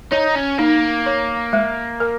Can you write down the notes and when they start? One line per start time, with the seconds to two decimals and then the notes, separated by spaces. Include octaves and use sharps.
0.12 D#4 C#5
0.36 C#4
0.59 A#3 D#4
1.06 C#5
1.53 G#3
2.00 A#4